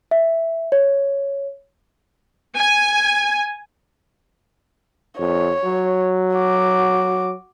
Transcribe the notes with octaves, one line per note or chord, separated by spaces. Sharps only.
E5
C#5
G#5
F2 C#5
F#3
F#4 D6